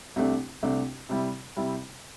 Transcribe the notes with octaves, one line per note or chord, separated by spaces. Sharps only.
C2 C3 A3 D4
C2 C3 A3 D4
C3 G3 E4
C3 G3 E4